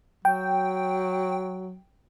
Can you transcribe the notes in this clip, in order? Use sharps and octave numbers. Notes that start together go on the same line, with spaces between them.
F#3 G5